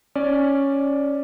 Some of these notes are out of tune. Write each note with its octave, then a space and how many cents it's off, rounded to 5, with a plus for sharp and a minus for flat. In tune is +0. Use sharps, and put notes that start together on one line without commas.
C#4 +0 D5 +0